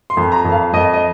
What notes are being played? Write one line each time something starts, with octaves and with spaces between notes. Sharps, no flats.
C6
F2
A#5
F2
F5
F2 D#5
D#5